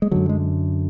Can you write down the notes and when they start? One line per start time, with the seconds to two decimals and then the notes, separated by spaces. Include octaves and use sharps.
0.02 G#3
0.11 F#2 D3 F#3
0.29 G#3